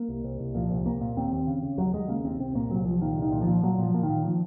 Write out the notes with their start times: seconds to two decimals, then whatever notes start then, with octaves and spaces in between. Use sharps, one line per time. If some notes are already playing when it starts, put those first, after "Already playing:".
Already playing: A#3
0.09 C2
0.24 C2
0.40 C2
0.55 A#2 F3
0.71 C2
0.85 C2 A#3
1.01 A#2
1.17 D#2 C4
1.32 D#2
1.47 C#3
1.62 C#3
1.78 D#2 F#3
1.93 D#2 G#3
2.09 C#3 A#3
2.24 D#2 C4
2.39 C2 C4
2.55 A#2 A#3
2.70 C2 F#3
2.86 C2 F3
3.01 A#2 D#3
3.17 C2
3.22 D#3
3.32 A#2
3.42 F3
3.47 A#2
3.63 A#2 F#3
3.78 A#2 F3
3.94 A#2
4.03 D#3
4.09 A#2
4.25 F3